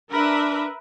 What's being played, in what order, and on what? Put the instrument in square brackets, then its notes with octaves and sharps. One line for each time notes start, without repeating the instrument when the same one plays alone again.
[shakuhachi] D4 [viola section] A#4 B4 E5